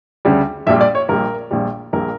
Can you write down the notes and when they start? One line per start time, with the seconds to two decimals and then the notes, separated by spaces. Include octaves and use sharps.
0.25 D2 C#3 G3
0.67 A#1 A#2 G3 E5
0.81 D5
0.95 C#5
1.09 A#1 A#2 G3 A#4
1.51 A#1 A#2 G3
1.93 A#1 A#2 G3 A#4